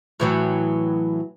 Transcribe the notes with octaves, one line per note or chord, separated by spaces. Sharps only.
A2 E3 F#3